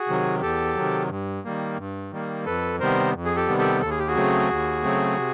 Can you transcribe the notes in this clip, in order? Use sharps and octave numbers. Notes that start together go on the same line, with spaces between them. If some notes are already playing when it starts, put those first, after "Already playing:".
Already playing: F#4 G#4
C3 D#3 F#3
E2 G4 A4
C3 D#3 F#3
G2
D#3 G3 A#3
G2
D#3 G3 A#3
F2 A4 B4
C3 D#3 G3 B3 A#4 C5
F2
G#4
G4 A4
C3 D#3 G3 B3
G4 A4
D#2 A4
G#4
G4
F#4 G#4
C#3 F#3 A3 C4
D#2
C#3 F#3 A3 C4
C3